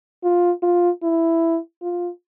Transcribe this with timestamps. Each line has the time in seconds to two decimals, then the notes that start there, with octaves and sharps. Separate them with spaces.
0.24 F4
0.62 F4
1.03 E4
1.82 F4